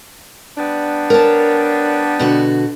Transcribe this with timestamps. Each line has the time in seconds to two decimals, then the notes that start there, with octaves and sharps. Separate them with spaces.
0.58 G3 B3 D4
1.10 A#4 C#5 A5
2.19 B2 D3 F#4